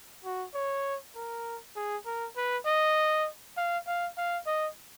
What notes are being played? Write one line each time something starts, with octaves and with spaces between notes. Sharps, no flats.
F#4
C#5
A#4
G#4
A#4
B4
D#5
F5
F5
F5
D#5